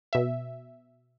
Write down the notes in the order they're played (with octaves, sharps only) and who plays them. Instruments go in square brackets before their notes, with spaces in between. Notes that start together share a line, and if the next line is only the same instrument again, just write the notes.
[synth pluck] B2 E5